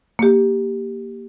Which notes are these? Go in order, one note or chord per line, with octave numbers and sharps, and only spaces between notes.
A#3 G4